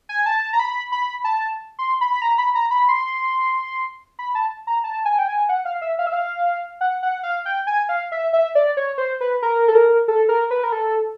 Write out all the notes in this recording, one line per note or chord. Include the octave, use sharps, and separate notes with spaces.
G#5
A5
A#5
B5
B5
A5
C6
B5
B5
A#5
B5
A#5
B5
C6
B5
A5
A#5
A5
G#5
G5
G#5
F#5
F5
E5
F5
E5
F5
F#5
F#5
F5
G5
G#5
F5
E5
E5
D5
C#5
C5
B4
A#4
A4
A#4
A4
A#4
B4
A#4
A4